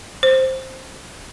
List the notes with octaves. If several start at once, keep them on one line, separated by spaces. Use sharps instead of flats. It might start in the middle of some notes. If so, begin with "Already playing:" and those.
C5